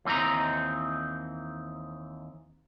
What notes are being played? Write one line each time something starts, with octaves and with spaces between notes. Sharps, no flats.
D#2 E3 C4 D#4 A#5